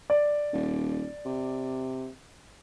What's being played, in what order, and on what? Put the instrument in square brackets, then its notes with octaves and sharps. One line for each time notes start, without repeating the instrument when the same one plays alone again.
[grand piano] D5
[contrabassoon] D#1
C3